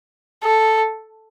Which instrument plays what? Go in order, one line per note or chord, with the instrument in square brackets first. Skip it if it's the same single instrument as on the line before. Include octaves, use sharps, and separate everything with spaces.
[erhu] A4